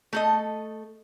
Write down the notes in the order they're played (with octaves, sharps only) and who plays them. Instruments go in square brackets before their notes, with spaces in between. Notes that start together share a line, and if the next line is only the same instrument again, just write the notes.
[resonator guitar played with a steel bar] A3 A4 D#5